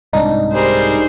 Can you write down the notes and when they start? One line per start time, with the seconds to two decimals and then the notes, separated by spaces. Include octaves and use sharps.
0.13 C2 G#2 D4 D#4
0.54 G3 G#4 A#4 C5